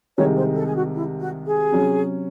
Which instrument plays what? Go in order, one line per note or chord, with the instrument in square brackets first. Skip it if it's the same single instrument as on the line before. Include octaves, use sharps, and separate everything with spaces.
[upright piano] C2 C3 D#3 G#3 [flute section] C#5
[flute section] C5
A4
G#4
F#4
E4
F#4
G#4
[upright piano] C3 F#3 C#4